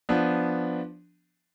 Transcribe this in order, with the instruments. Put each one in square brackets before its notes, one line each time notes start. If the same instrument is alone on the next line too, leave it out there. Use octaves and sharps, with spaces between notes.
[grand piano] F3 B3 D4